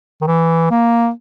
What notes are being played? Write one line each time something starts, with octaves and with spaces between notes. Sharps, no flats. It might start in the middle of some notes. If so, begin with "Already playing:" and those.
D#3
E3
A#3